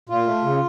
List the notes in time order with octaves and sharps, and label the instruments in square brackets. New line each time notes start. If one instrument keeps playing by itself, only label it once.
[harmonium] A#2 F4
A3
C#3